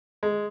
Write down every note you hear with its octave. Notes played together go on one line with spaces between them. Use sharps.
G#3